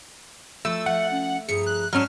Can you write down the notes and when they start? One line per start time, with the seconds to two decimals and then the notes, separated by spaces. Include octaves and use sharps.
0.65 F3 A3 E6
0.86 F3 E5 F#5
1.11 C#4
1.49 G2 F3 G#4 A#5 C#7
1.66 F#6
1.93 G#2 F#3 C#4 A5 F6